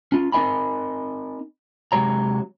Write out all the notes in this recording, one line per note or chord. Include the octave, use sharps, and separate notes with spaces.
C#4 F4
C4 D#4 A#4 D#5 G#5 B5
C3 F#3 G#3 G4 C#5 A#5